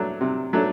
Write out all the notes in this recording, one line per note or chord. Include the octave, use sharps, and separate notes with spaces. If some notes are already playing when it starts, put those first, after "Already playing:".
Already playing: F#3 A3 D4
C3
F#3 A3 D4